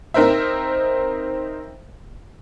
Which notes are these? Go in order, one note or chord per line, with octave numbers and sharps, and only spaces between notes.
C4 D#4 A#4 C5 E5